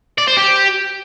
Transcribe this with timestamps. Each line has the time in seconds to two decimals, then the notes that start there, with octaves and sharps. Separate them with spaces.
0.18 D5
0.27 C5
0.37 G4